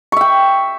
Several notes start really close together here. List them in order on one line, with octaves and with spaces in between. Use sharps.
C#6 E5 G5